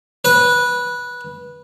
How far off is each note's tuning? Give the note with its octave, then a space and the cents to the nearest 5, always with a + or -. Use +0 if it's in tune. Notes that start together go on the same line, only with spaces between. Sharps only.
B4 -15